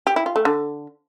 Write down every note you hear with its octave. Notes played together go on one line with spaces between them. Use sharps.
G4
E4
F4
A3
D3